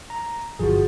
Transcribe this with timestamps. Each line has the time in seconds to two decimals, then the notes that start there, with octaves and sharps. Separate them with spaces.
0.10 A#5
0.59 G1 F3 F#4 G#4